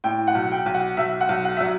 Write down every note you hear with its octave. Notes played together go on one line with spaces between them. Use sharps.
A2 G5
F#5
B1
G5
B1
F#5
B1 E5
F#5
B1
F#5
F#3 E5